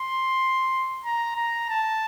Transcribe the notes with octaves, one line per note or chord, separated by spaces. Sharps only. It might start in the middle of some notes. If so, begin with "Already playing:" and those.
Already playing: C6
A#5
A#5
A5